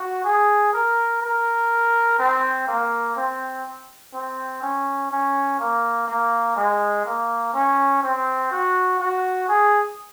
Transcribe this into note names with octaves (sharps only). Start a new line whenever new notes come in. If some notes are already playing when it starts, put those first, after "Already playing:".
Already playing: F#4
G#4
A#4
A#4
C4
A#3
C4
C4
C#4
C#4
A#3
A#3
G#3
A#3
C#4
C4
F#4
F#4
G#4